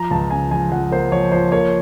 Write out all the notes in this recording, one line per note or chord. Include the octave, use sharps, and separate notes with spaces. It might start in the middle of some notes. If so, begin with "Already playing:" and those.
Already playing: F3 A#5
C#2 A5
C#3 G#5
F3 G#5
F3 F#5
A#3 C5
F3 C#5
F3 C5
A#3 C#5